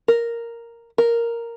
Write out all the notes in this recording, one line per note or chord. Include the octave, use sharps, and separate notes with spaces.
A#4
A#4